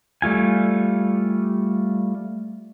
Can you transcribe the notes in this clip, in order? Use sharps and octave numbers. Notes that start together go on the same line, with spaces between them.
G3 A3 F4 G#5